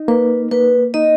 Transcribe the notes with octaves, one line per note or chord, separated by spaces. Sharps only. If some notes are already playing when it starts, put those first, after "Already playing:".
Already playing: D#4
A#3 B4
A#3 B4
D#4 D#5